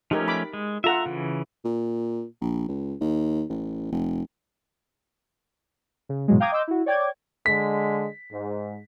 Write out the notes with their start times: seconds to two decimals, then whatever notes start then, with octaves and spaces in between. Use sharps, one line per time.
0.11 F3 A3 C#4 D#4 G4 A#4
0.28 B5 D6
0.53 G#3
0.84 F4 A4 E5 F#5 A#5
1.06 C#3 E3
1.65 A#2
2.41 A#1
2.68 C#2
3.00 D#2
3.49 A1
3.92 F1
6.09 C#3
6.28 G#2 B2 E3 F#3 G#3
6.40 F5 G5 A#5 D6 D#6 G#6
6.52 D#5 C6 D6 E6 G6
6.68 E4 F#4
6.86 C#5 D5 G5 D6 G#6
7.46 D3 G#3 B6
8.32 G#2